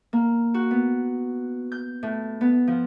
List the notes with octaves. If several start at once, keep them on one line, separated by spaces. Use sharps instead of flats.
A#3
F#4
B3
G6
A2
B3
F3